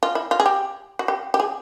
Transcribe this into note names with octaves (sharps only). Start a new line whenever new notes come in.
F4
E4
F4
G#4
G4
F#4
G4
G4
G#4